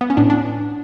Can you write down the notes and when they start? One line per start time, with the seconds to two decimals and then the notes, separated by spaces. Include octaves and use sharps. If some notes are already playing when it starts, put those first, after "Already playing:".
0.01 B3
0.10 C#4
0.17 A2 D4
0.30 D4